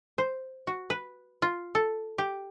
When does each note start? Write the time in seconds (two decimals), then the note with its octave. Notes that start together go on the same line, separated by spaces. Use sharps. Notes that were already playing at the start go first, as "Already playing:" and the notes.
0.18 C5
0.67 F#4
0.90 B4
1.42 F4
1.75 A4
2.18 G4